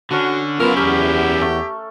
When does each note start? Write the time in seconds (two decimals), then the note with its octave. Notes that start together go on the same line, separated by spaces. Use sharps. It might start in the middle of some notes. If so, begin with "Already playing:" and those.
0.11 D3 C#4 F#4 A5
0.60 F#2 B3 E4 F4 A#4 E6
0.76 E2 C#4 G4 A#4 G#5
1.41 A3